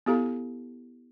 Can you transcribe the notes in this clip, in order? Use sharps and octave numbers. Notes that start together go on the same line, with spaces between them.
B3 E4 G4 A4 F5 A#5